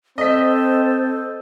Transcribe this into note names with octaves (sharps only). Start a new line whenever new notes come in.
C4 A4 C5 D#5 B6